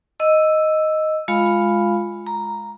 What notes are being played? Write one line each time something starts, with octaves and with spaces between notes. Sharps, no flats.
D#5 E6
G#3 F4 F5 B5
A#5